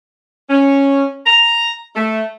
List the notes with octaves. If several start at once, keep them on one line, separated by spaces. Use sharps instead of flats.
C#4
A#5
A3